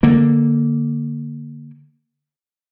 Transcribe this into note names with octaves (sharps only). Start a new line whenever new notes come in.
D3 A#3